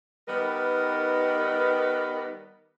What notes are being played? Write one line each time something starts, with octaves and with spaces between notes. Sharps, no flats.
D#3 G3 B3 D#4 A#4 B4